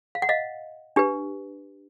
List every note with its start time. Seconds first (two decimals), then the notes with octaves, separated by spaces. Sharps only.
0.15 F5
0.22 F#5
0.29 D#5 F5
0.96 D4 G4 B4